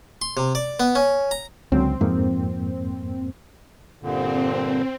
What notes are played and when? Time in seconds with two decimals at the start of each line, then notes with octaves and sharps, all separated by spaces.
0.22 C6
0.37 C3
0.55 D5
0.80 B3
0.95 C#4
1.31 A#5
1.72 C#2 D3 F#3 C4 C#4
2.01 F2 G#2 F3 A#3
4.02 G2 A#2 D3 C4